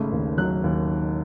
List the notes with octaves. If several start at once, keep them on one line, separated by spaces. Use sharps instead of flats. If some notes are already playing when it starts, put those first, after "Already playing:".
Already playing: G#1 C#3 A3
D#2
F#3 F#6
D#2